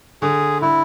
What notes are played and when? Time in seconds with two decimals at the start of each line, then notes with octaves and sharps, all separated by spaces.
0.22 D3 G#4
0.62 D3 E4